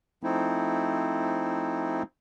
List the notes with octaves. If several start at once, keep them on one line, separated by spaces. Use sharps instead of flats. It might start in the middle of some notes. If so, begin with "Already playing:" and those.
F3 A3 C4 D#4 E4